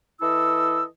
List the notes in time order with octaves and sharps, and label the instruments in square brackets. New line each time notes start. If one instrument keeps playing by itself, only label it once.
[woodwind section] E3 E4 A4 D#5 E6